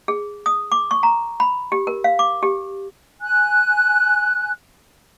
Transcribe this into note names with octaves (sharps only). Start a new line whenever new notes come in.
G#4
D#6
D6
C#6
A#5
B5
G4
A#4
F5
D6
G4
G#5 F#6